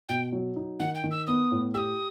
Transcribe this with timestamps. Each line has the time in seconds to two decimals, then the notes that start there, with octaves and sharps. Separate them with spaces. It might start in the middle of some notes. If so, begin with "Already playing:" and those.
0.09 B2 G5
0.32 F#3
0.56 D#4
0.80 D#3 F#5
0.95 G5
1.04 D#3
1.11 E6
1.27 B3 D#6
1.51 A2
1.74 G4 D#6 E6